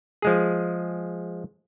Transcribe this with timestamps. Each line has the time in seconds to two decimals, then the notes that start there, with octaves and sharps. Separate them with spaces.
0.22 F3 G#3 G#4